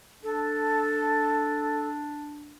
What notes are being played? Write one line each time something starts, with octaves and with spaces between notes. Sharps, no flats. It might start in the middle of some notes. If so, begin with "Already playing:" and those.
D4 A4